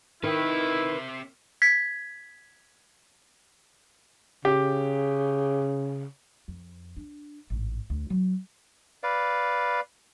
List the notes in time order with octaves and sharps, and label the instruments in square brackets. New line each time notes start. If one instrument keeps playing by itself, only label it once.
[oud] D#3 [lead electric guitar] C4 E5 [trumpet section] E4 [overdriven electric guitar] B4
[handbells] G#6 B6
[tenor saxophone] C#3 [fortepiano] G4
[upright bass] F2
D4
A1 G#2
D2
F#3
[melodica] B4 D5 F5